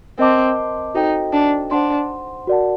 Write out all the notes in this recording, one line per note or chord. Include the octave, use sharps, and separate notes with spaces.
C4 A#4 D#5 A5 D6
D#4 F#4 A4 C5 G5
D4
D4 C5 F#5 C6
F#4 A#4 D5 F#5 A5